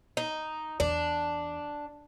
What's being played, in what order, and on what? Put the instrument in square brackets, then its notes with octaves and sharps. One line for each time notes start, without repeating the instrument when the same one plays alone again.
[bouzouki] D#4
[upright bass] E2 [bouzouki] D4